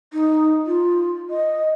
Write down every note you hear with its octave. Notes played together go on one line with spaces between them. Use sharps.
D#4
F4
D#5